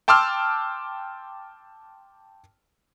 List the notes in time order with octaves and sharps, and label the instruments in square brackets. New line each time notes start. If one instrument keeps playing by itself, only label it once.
[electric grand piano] G5 A5 C6 D6 E6 F6